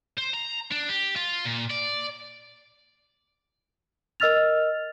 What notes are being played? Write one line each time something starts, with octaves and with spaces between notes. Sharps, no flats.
C5
A#5
D4
G4
F4
A#2
D5
A#4 D#5 E6 F6 A6 F7